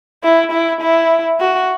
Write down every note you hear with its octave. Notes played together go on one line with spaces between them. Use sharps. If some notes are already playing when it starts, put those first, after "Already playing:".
E4
E4
E4
F#4